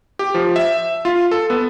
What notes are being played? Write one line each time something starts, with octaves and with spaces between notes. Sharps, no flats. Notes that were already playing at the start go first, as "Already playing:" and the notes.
G4
F3
E5
F4
A4
B3